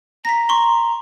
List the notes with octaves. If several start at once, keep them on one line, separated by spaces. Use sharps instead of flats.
A#5 A#6 B6
C6 C#6